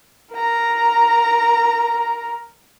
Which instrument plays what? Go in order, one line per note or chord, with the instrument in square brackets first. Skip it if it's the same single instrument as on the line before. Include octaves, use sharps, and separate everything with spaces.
[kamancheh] A#4 A#5